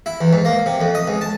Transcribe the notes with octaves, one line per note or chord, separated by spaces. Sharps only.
E4
E2
G#2
A#3
C3
F2
D#5
C#2
A5